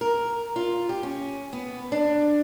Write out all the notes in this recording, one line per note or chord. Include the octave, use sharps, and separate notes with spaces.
A#4
F4
G4
C#4
B3
D4